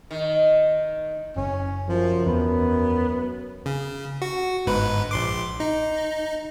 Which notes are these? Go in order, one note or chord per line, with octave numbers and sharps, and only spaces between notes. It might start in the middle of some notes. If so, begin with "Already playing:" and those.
D#3
F#1 C#4
F#2 F3
E2 B3
C#3
F#4
G1 G#2 B4
A#1 C6 D6
D#4